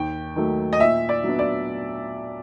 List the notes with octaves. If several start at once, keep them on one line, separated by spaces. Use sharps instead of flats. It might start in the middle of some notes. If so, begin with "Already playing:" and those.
Already playing: D#2 G5
D#3 F#3 A3
D#5
A#2 E5
D5
F#3 B3 D4
D5